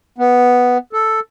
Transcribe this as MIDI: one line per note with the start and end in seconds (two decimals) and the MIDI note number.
0.18 0.78 59
0.93 1.20 69